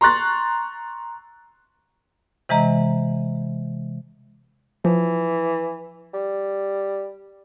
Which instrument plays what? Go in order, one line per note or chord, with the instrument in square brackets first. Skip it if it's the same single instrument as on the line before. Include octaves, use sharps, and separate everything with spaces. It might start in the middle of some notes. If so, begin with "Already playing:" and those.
[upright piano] A#5 C6 C#6 F#6 A6
[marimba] C3 E3 G#3 D#5 A#5
[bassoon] E3 [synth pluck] F3
[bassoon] G3